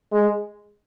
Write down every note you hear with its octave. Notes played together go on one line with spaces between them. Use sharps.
G#3